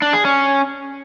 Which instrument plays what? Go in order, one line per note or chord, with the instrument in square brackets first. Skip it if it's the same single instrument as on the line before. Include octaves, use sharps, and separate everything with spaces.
[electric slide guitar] D4
G#4
C#4